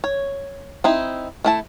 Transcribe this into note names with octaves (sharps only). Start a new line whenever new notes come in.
C#5
C4 D#4 E4
A3 E4 A5